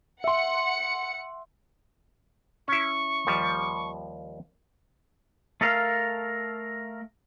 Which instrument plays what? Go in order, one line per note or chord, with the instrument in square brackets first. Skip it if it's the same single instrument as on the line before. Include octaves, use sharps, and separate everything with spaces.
[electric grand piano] E5 C6 [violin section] F#5 C#7
[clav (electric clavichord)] C#4 E4 [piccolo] C#6
[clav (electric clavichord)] D#2 F3 G3
[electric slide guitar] A3 A4 A#4 F5